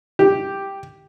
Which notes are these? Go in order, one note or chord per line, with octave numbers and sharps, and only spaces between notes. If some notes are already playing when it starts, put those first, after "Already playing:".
G4